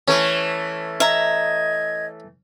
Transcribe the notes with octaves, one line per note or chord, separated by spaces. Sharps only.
E3 A3 C#4
D#5 E5 A#5 G#6